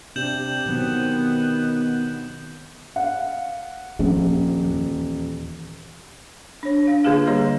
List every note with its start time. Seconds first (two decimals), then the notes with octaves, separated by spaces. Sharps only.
0.16 C3 D4 G4 G6 E7 F#7
0.66 B2 D#3 F#3 B3 C4
2.96 F5 F#5
3.99 D#1 F3
4.65 E2
6.63 D4 C#5
6.87 D4 F5
7.04 D3 A#3 F4 G4 G#4 F5
7.27 G3 A#3 C#5 D#5 A#5 C6